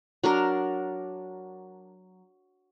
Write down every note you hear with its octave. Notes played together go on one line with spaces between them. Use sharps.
F#3 D4 A#4